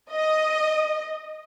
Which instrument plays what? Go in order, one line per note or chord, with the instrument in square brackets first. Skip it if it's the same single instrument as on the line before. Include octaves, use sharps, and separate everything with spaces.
[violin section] D#5